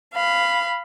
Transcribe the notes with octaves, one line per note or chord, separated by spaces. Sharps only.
F5 B5